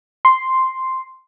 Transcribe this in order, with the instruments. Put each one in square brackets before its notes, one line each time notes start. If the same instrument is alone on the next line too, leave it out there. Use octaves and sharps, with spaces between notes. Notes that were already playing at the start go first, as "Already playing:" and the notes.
[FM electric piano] C6